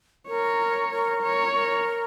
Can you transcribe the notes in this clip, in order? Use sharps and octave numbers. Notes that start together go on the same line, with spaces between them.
A#4 C#5
A#4
C#5
A#4